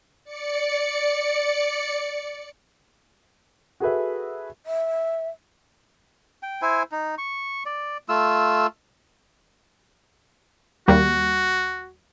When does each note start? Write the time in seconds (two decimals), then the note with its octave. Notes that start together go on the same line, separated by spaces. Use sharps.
0.24 D5 C#7
3.80 F#4 G#4 A4 B4 E5
4.66 E5
6.43 G5
6.62 E4 C5 G#5
6.92 D#4
7.18 C#6
7.66 D5
8.09 A3 F4 E6
10.88 D#2 G3 A#3 F#4